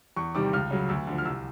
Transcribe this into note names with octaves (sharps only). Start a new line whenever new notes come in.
E2 C#6
C3 D#3 G3 D6
C#2 F6
C#3 F#3
D2 E6
D3 F3
F6
C2 E6